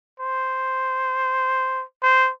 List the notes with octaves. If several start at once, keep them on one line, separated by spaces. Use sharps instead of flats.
C5
C5